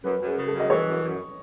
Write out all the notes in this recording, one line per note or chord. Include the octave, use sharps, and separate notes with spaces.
F#2 B4
F#2
G#4
C#3
A4
F#2
D#5
E3 C#5
F#2
F#2